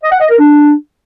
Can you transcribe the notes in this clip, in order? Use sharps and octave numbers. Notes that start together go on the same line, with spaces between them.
D#5
F#5
D#5
A#4
D4